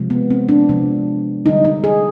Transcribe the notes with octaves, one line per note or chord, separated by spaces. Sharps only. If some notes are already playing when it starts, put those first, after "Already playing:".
Already playing: C3 F3 G#3
B3
C4
D4
C3 F3 G#3
D3 G3 D#4
D#4
G#4